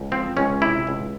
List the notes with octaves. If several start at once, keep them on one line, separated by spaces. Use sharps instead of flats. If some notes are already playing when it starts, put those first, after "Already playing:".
Already playing: C#2
F3 C4
C#2 C#4
C3 E4
C#2